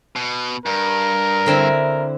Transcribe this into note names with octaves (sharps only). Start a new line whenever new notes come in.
B2
G2 A#4
D3 C4 E4